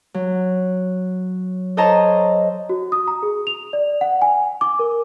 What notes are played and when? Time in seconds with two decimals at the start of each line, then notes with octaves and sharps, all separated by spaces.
0.14 F#3
1.77 A4 C5 C#5 D#5 A5 A#5
2.69 F#4
2.92 D#6
3.08 A#5
3.23 G#4
3.47 F7
3.73 D5
4.01 F#5
4.22 G#5
4.61 D6
4.79 A#4